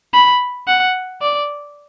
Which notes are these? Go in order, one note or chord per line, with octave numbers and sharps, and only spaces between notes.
B5
F#5
D5